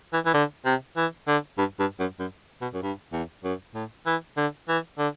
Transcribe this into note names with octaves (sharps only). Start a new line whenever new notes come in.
E3
E3
D3
C3
E3
D3
G2
G2
F#2
F#2
B2
F#2
G2
E2
F#2
A2
E3
D3
E3
D3